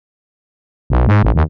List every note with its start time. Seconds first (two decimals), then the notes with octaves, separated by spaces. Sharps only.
0.90 B1
1.07 G#2
1.23 A1
1.35 D#2